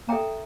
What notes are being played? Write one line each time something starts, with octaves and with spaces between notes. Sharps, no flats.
A#3 A4 E5 G5 A#5